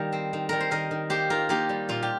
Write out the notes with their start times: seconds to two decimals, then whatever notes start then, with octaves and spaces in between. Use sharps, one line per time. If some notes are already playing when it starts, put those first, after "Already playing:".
Already playing: D#3 G3 A#3 A#4
0.13 C4
0.33 D#3
0.49 G3 A#4
0.60 C5
0.71 D#3 A#4 D#5
0.91 D#3
1.10 A#3 G4 C5
1.30 D#3 F4 A#4
1.49 A#3 D#4 G4
1.69 G3
1.89 A#2 F4
2.03 G4